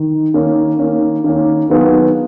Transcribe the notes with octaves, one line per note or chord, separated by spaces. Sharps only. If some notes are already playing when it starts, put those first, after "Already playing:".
Already playing: D#3
D#3 A#3 C#4
D#3 A#3 C#4
D#3 A#3 C#4
D#3 F#3 B3 F4 G#4